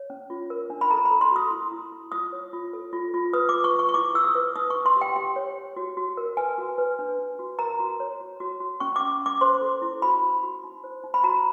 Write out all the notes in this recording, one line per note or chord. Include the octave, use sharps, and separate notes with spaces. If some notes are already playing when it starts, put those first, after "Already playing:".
Already playing: C#5
C#4
F4
A#4
D4
B5
A4 A#5
B5
A4
C6
F#4 D#6
E4
E4
E4
F4 D#6
C#5
F4
A4
F4
F4
B4 D#6
F4 D6
C#6
F4 C#6
C#6
E4 D6
G#4 E6
D#6
B4
D#4 D#6
C#6
D#4
C6
G4
G5
G4 G5
C#5
C#5
F#4
F#4
A#4
B4 G#5
F#4
B4
D4
D4
F#4
A#4 A#5
F#4
C#5
F#4
F#4
F#4
C#4 C#6
D6
C#4
C#4 D6
C5 C6
A4
E4
F#4 B5
F#4
F#4
D#4
C5
D#4
B5
F#4 A#5